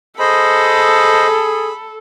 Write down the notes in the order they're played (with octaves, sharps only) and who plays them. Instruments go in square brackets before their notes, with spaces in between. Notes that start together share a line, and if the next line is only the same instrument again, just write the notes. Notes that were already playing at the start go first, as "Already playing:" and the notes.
[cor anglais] G#4 [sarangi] A4 [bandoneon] C5 D#5 [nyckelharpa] B5